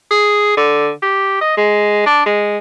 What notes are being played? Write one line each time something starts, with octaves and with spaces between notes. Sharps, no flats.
G#4
D3
G4
D#5
G#3
D4
G#3